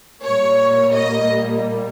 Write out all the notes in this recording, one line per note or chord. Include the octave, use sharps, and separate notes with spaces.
A#2 G3 A#3 C#5
D#5